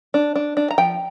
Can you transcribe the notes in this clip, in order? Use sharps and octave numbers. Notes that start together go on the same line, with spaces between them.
D4
D4
D4
A#5
F3 G5